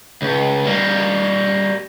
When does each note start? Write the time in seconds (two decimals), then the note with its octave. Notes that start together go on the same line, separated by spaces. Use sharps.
0.22 C#2
0.65 G3 A#3